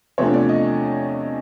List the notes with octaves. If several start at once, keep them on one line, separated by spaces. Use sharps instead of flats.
E2 C3 F3 A3 D4 C#5
D5
D#5